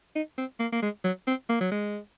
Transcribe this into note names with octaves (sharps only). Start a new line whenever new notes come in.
D#4
C4
A#3
A#3
G#3
F#3
C4
A#3
F#3
G#3